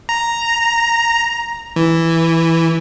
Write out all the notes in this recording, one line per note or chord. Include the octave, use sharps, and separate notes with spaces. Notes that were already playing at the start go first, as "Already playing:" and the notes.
A#5
E3